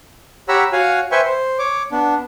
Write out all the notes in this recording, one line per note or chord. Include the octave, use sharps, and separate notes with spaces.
G4 C#5 F#5 A#5 B5 E6
F#4 C#5 F5 F#5 G#5
B4 C5 E5 G5 G#5 C#6
C5
C#5 D6
B3 D4